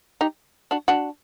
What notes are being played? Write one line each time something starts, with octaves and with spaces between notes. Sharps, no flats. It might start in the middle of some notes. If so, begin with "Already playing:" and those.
D#4 G4
D4 F#4
D4 F#4